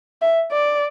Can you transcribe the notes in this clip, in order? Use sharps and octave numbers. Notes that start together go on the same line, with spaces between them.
E5
D5